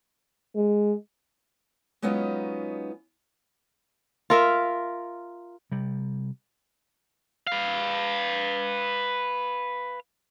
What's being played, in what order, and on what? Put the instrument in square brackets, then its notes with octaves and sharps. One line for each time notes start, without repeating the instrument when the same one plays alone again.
[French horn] G#3
[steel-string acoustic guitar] F#3 G#3 B3 C#4 D#4 F4
[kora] F4 A#4 E5
[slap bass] C3 G3
[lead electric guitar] B4 F5